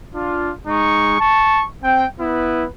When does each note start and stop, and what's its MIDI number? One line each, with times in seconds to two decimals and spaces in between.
0.15 0.52 62
0.15 0.52 65
0.67 1.20 56
0.67 1.20 63
0.67 1.20 85
1.20 1.65 81
1.20 1.65 85
1.84 2.06 60
1.84 2.06 79
2.20 2.66 59
2.20 2.66 64
2.20 2.66 71